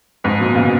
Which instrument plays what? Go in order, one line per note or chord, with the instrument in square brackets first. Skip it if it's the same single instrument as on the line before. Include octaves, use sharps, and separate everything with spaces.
[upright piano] F2 G#2
F#2 A#2
B2
A#2 C#3